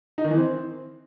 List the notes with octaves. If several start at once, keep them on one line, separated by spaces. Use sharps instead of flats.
D#4
D#3
E3
C4